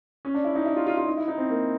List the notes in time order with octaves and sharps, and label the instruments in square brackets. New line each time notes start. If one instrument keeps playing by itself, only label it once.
[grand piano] C#4
D4
E4
D#4
E4
F4
F4
F4
D#4
E4
D#4
C4
A#3